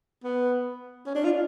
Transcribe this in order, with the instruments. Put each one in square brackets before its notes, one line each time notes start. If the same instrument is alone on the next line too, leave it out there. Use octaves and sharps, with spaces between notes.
[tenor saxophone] B3
C#4
D4
F4